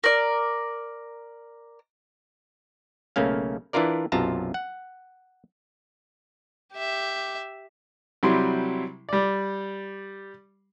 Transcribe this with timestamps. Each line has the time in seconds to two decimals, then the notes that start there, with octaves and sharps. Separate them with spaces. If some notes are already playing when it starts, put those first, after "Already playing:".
0.04 A#4 D5
3.16 B1 C#3 A3 A#3 C#4 F5
3.73 E3 D4 E4 F4 A#4 D5
4.12 B1 F#2 C3 F4 A5 A#5
4.54 F#5
6.73 G4 E5
8.23 C3 F#3 G3 E4 G4 C6
9.09 G3 D5